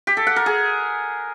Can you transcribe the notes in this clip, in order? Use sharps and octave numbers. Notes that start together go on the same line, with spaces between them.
G4
A4
F#5
A#4
G#4